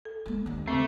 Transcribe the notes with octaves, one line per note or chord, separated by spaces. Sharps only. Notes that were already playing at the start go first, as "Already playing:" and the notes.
A4
G#3 A#3
D#2 D4
C#3 A3 C4